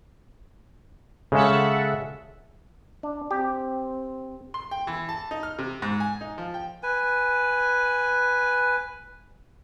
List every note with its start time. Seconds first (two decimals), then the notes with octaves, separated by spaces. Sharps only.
1.32 C#3 G#3 C#4 A4 E5 F#5
3.03 D4
3.31 C4 G4
4.54 C6
4.71 G5
4.87 E3
5.09 A5
5.31 D#4
5.43 F6
5.58 C3
5.82 G#2
6.00 G#5
6.21 D#4
6.38 F3
6.54 G5
6.83 B4 G#5